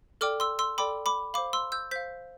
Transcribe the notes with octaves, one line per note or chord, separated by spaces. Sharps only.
A4 D5 G5 D6 F6
C6 E6
C6 E6
A4 D5 G5 B5 D6
B5 D6
C5 F5 B5 D6
C6 E6
E6 G6
C5 F5 G6 B6